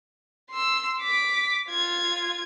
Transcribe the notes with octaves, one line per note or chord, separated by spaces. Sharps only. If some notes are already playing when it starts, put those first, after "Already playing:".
C6 E6
D6 B6
F4 G#6